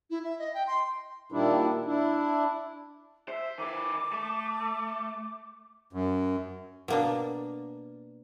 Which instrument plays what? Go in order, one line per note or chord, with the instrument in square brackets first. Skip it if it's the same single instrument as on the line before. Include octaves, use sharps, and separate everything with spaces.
[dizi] E4
E5
D#5
G5
C6
[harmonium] A#2 D#3 G3 D4 E4
D4 E4
[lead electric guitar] C5 [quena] E5
[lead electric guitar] D#3 B4 [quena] D6
[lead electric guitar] A3
[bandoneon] F#2
[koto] B2 A#3 D4